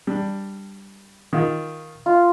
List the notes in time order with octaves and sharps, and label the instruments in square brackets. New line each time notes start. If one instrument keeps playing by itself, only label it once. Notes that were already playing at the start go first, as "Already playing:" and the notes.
[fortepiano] G3 D4
D#3 F4
[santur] F4